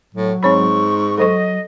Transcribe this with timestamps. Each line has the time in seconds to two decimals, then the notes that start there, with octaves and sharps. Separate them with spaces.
0.14 A2 F#3
0.43 G#2 C4 C#5 B5 C#6
1.18 F#3 A4 C5 D#5 C#6